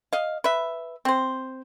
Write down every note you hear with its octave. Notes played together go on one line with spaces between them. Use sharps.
D#5 F5
B4 E5
C4 C5